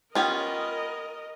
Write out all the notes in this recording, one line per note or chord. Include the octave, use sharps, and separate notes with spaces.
B3 C#4 F4 G4 A#4 D#5 G5